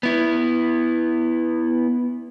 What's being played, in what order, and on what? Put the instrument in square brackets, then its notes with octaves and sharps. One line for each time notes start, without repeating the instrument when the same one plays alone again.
[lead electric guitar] B3 E4